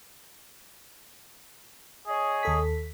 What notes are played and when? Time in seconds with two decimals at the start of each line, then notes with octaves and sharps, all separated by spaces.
2.07 G#4 C#5 D#5
2.43 D#2 A4 B6